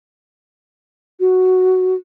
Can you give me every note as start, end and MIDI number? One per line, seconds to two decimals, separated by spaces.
1.20 1.94 66